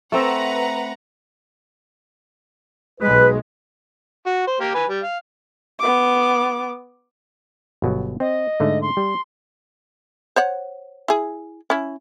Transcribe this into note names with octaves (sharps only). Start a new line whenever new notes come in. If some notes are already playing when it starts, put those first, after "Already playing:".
A3 C4 B4 E5 F#5 A#5
B1 G#3 B4
F#4
C5
A#3 G4 A#4
B4 G#5
G3
F5
B3 D6
G1 B2 F#3
C4 D#5
G#2 D3 A3
C6
G3
C5 C#5 F#5
E4 G#4
C#4 E4